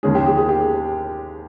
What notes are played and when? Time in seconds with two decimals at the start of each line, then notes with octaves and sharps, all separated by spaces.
0.03 D#2 D#3 G#3 C#4 G#4
0.15 G4
0.26 G4
0.37 G#4
0.49 G4